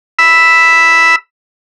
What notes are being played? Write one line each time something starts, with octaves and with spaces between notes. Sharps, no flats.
B5 E6